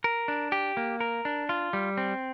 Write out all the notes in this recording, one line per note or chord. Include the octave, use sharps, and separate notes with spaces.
A#4
D4
G4
A#3
A#4
D4
F4
G3
C4